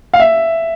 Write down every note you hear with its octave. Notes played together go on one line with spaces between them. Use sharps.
F5
E5